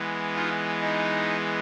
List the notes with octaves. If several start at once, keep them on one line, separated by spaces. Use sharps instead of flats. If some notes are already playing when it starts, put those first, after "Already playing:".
Already playing: E3 G#3 B3
D#4 F4
D#4